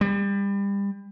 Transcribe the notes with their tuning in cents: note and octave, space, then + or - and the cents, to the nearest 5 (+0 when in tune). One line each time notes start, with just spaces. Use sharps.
G3 +30